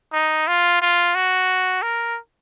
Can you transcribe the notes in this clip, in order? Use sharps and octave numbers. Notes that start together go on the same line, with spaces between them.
D#4
F4
F4
F#4
A#4